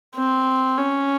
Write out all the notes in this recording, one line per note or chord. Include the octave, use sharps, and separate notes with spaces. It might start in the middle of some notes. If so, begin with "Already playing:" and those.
C4
C#4